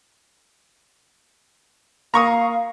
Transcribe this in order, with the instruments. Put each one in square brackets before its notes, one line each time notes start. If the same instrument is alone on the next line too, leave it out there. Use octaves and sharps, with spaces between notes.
[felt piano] A#3 [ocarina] F5 [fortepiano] A#5 C#6 D#6